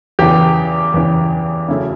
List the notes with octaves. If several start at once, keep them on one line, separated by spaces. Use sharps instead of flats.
E2 C#3 E3 G4
E2 C#3 E3
F#2 C#3 F#3 A3 E4